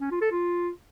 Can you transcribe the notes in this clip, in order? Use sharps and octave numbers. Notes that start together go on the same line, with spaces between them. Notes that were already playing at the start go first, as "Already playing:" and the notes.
C#4
F4
A4
F4